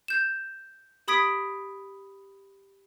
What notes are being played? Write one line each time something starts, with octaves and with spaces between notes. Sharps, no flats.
G6 E7
G4 B5 D#6 G#6 B6 D7